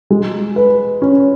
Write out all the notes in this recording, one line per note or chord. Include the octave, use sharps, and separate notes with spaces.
G#3
B4
C#4